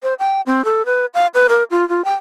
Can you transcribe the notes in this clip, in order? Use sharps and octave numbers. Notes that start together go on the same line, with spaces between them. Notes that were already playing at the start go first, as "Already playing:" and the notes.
C5
G5
C4
A4
B4
F5
B4
A#4
F4
F4
G5